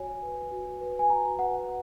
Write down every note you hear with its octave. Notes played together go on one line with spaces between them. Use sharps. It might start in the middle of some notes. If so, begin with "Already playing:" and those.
Already playing: F#4 C#5 G#5
B4
F#4
B4
G#5
F#4 A#5
B4 F#5